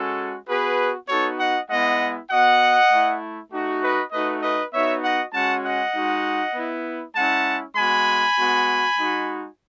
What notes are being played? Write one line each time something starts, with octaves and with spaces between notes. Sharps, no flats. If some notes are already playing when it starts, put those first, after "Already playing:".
Already playing: G#3 C#4 F#4 A4
B3 F#4 G#4 B4
B3 D#4 F#4 A4 C#5
D#5 F#5
G#3 B3 E4 D#5 F#5
B3 F#4 D#5 F#5
A3 E4
A3 D#4 F#4
B4 D#5
A3 D#4 F#4 B4 D#5
B4 D#5
B3 D#4 F#4 C#5 E5
D#5 F#5
G#3 C#4 F#4 F#5 A5
D#5 F#5
G#3 D#4 F#4
B3 E4
G#3 C#4 E4 F#5 A5
G#3 B3 F#4 G#5 B5
G#3 B3 F#4
G#3 D#4 F#4